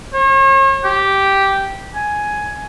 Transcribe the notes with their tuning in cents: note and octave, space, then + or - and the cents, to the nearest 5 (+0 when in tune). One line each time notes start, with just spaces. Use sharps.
C#5 -40
G4 -5
G#5 +10